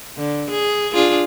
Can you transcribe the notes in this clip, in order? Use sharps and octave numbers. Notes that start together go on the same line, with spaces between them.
D3
G#4
D4 F4 G#4